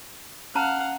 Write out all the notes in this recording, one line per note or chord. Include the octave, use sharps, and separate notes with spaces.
C#4 F5 F#5 A5 A#5